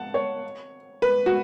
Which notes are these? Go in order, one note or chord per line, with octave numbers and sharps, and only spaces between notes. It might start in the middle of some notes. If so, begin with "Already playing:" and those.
Already playing: F#5 A5
C#5
B4
F#4